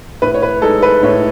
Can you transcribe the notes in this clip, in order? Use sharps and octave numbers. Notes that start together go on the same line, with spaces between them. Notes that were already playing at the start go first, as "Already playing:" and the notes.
A2 B4
C#5
B4
G#3 D#4 A4
B4
A2 C#5